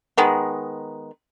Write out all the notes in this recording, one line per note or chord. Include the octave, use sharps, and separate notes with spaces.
D#3 G#3 B3